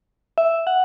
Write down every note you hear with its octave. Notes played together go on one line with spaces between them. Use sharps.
E5
F#5